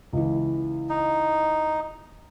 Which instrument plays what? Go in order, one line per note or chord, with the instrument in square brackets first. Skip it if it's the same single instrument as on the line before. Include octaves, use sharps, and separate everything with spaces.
[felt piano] C#2 E3
[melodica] D#4